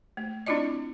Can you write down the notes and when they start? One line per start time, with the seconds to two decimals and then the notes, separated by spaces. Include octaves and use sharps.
0.17 A3
0.46 C4 D4 E4 F4 D5 D#5